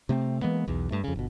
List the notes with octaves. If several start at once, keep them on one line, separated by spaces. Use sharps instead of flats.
C3 A3 B3 C4
E3 G#3 A#3 B3
B1 E2
G2 A3
F2 C#3
G1 B2